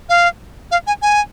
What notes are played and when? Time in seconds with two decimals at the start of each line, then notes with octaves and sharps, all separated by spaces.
0.09 F5
0.71 F5
0.87 G#5
1.02 G#5